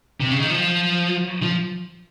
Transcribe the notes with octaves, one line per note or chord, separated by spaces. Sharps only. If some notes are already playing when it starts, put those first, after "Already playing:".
C3
C#3
D#3
F3
F3